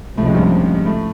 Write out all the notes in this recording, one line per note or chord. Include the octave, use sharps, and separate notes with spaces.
C#2 A2 C3 F3 A3
G#2 G#3
G2 G3
G#2 G#3
A2 A3